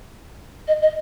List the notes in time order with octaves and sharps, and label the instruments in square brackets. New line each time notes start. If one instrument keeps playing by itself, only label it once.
[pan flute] D#5
D#5